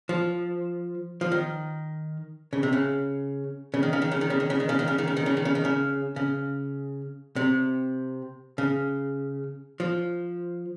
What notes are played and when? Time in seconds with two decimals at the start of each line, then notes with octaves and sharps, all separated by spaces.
0.09 F3
1.21 F3
1.32 D#3
2.53 C#3
2.63 C3
2.73 C#3
3.74 C#3
3.83 D#3
3.93 C#3
4.02 D#3
4.12 C#3
4.21 D#3
4.30 C#3
4.40 D#3
4.50 C#3
4.60 D#3
4.69 C#3
4.79 D#3
4.88 C#3
4.98 D#3
5.08 C#3
5.17 D#3
5.26 C#3
5.37 D#3
5.45 C#3
5.55 D#3
5.65 C#3
6.16 C#3
7.36 C3
8.58 C#3
9.80 F3